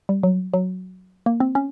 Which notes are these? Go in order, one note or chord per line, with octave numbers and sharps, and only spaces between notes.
G3
F#3
F#3
A#3
C4
C#4